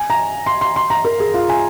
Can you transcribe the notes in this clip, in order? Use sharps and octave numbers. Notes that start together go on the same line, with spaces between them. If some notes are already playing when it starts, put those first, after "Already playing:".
Already playing: G#5
A#5
C6
C6
C6
A#5
A#4
G#4
F4
G#5